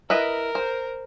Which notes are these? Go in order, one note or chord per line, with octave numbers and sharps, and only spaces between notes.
E4 A#4 B4 D#5
C5